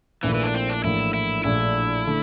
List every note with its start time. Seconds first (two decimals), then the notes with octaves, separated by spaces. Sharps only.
0.23 A#1 A#2 E3 A3 E4 A#4
0.34 E3
0.43 D4
0.54 C4
0.69 D4
0.84 A#1 A2 E3 A#3 E4
1.14 E4
1.44 A#1 A#2 A3 D4 E4
2.06 D3 A3